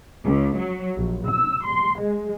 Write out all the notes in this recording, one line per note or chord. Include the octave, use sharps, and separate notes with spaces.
C#2
F#3
A#1
E6
C6
G#3